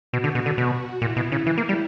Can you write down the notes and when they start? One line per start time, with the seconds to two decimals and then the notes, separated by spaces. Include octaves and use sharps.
0.13 B2 F#4
0.24 D3
0.35 B2
0.46 D3
0.57 B2 F#4
1.02 A#2 E4
1.16 B2
1.32 C#3
1.46 E3
1.58 A#3
1.69 G3